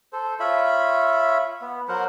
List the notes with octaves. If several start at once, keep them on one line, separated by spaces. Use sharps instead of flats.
A4 C5
F4 C#5 E5 B5
B3
F#3 A#4 C5 F#5